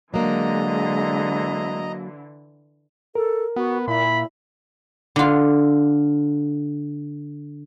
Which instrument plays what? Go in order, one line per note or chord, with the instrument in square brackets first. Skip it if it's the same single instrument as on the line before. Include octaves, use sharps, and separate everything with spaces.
[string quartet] D3 E3 [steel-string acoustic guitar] F#3 A#3 [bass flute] G#3 [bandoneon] D#5 A#5
[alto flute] A4 [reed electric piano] A#4
[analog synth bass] B3 [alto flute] F#4
[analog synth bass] A#2 [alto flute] E4 [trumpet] B5
[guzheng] D3 F4